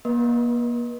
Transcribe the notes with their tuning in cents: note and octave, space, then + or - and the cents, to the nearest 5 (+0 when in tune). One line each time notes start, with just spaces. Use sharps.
A#3 +40 B4 -30 D#5 +0